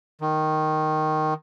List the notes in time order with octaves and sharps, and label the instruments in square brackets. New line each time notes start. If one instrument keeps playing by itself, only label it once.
[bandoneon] D#3